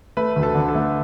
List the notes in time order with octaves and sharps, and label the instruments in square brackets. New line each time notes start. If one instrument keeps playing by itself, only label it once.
[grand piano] A3 [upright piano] B4
[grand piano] D2
[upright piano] A4
[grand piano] D3
[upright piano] A4
[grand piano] A3